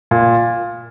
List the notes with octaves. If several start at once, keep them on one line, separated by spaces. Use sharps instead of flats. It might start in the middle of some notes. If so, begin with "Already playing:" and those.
A#2